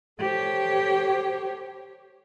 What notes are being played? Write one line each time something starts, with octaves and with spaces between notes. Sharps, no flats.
G4 A4 C5 C#5